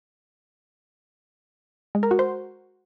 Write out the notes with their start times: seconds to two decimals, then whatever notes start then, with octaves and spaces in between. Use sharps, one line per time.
1.95 G#3
2.03 A#4
2.11 F#4
2.19 C5